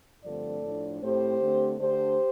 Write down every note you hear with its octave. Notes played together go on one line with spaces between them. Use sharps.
G2 D3 F3 A3 C4 A4 D5
A2 F3 D4
A2 A3 C4 G4 C5
D3 A3 C4
D3 A3 D4 G4 C5